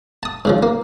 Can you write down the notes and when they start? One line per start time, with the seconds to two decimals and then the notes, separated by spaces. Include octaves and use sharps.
0.23 A5 D#6
0.45 G#2 C#3 F3
0.63 A#3